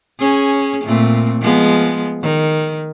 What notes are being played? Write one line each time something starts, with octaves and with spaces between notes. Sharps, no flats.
C#4 G#4
A#2 A3 C4
F3 G#3 B3
D#3